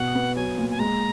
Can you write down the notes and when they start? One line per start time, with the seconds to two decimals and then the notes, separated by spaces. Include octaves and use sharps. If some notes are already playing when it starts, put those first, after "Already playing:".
Already playing: B2 F#5
0.15 B3
0.36 F#3 G#5
0.58 A#2
0.71 G#5
0.79 G#3 A#5